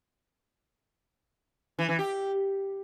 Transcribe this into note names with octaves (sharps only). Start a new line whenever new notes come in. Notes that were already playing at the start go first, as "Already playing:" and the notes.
E3
E3
G4